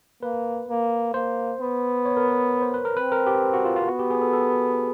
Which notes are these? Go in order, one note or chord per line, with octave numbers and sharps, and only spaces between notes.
A#3 B4
A#3
A#3 C5
B3
C#5
A#4
B4
C5
B4
A#4
C4 B4
A#4
G4
F#4
F4
F4
B3 F#4
G4
G#4
A4
A4